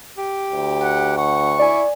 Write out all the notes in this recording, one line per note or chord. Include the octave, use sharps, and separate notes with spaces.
G4
D2
F#5
F#5 C#6
E4 D5 G#5